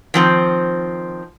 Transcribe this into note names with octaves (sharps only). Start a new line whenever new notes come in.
D#3 F3 C4